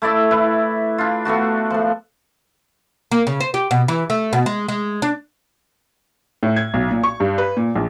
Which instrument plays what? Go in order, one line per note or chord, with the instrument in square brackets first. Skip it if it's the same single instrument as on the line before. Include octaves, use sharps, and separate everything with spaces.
[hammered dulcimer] A3 E4 D5 E5
E4 B4
D4 F4
A3 B3 D4 F#4
F3 A3
[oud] A#3
C#3
C5
G4
B2
E3
A3
B2
G#3
G#3
D4
[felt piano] A2
G#6
B1
A#2
C#6
G2
B4
A#2
A#1